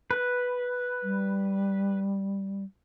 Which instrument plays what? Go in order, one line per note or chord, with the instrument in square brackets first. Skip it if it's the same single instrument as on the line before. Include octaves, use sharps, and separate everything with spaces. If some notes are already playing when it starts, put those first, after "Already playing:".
[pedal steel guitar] B4
[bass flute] G3